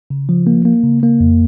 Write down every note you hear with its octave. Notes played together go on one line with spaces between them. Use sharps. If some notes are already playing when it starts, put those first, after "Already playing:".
C#3
F3
A#3
A#3
C#3
A#3
F2